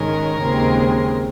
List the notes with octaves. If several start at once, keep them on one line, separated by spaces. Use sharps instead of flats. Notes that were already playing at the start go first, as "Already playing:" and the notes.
Already playing: G#2 D#3 G#3 C#4 A#4
D#2 C#3 G#3 C4